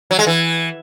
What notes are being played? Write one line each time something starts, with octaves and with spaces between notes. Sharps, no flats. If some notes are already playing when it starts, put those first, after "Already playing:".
F#3
G#3
E3